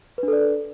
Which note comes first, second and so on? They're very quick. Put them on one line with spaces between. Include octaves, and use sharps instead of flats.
B4 D4 A4 D5